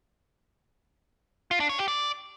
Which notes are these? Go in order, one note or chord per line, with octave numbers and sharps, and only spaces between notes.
F4
D4
C#5
G4
D5